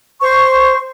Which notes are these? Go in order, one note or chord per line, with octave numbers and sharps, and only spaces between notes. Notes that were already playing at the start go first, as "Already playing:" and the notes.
C5 C#6